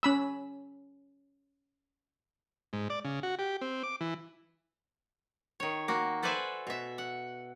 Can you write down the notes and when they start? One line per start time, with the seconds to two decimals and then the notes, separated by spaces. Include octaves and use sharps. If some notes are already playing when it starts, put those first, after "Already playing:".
0.03 C#4 B5 E6
2.73 G#2
2.90 D5
3.05 C#3
3.23 F#4
3.39 G4
3.61 C4
3.83 D6
4.01 E3
5.60 D#3 C#5
5.88 A#3 F#4
6.23 A4 B4 C5 D5 E5 G#5
6.67 B2 E5
6.98 F#5